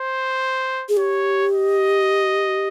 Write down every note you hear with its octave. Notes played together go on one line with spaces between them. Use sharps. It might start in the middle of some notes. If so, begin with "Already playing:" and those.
Already playing: C5
G#4
G4 C#5
D#5